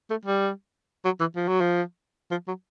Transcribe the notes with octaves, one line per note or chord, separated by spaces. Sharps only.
A3
G3
F#3
E3
F3
F#3
F3
F3
F#3